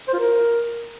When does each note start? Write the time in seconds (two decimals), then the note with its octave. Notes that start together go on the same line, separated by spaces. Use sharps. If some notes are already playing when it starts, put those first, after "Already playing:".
0.08 C5
0.13 F4
0.19 A#4